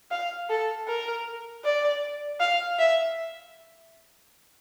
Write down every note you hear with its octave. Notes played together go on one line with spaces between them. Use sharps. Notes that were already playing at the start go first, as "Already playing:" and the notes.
F5
A4
A#4
D5
F5
E5